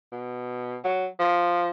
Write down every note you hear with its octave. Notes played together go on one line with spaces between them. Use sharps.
B2
F#3
F3